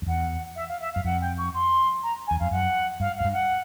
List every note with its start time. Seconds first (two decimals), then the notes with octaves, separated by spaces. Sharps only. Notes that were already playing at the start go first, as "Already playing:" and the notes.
0.02 F2
0.07 E2 F#5
0.55 E5
0.68 F5
0.80 E5
0.92 F5
0.96 F#2
1.04 F2 F#5
1.21 G5
1.37 C#6
1.53 C6
2.02 A#5
2.27 G#5
2.31 E2
2.39 F2 F5
2.51 F#2 F#5
3.00 G2 F5
3.16 F#2 F5
3.24 G2
3.32 F#5